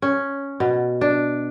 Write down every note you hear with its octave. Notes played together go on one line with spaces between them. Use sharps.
C#4
B2
D4